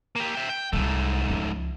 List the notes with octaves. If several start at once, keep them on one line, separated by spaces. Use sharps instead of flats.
A#3 G4
E5 G5
G5
C2 G#2 C3 A3
C#2 F3